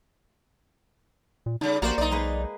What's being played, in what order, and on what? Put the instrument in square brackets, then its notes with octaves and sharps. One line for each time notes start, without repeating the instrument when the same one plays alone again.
[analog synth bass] A#2
[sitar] C#3 G3 [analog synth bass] D#4
[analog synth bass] A#1 [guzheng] A#3 C5 [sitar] F#4 G4 D5
[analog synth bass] B1 [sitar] D#4 D5
[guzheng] G#3 A#3 B4